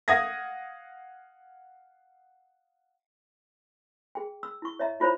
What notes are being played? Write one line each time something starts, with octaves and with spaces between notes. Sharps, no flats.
F5 F#5 D#6 G#6 A#6
G#4 G5
E6
E4 C#6
C#5 D#5 E5 A#5
E4 F4 C5 C#5 A#5 B5